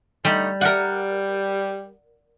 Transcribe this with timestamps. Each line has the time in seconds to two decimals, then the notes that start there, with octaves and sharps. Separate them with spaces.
0.25 D3 G3 A3 D#4
0.61 G3 A#4 D5 F#5